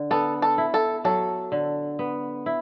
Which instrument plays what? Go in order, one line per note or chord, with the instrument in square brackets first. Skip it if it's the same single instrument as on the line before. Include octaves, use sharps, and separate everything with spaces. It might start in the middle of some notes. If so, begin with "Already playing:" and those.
Already playing: [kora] D3
[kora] B3 [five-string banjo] A4
[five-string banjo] A4
[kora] E4
[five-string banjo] A4
[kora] F#3 [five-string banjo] A4
[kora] D3
B3
E4